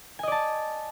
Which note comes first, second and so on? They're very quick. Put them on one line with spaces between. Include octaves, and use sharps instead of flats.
G#5 D#5 D5 A5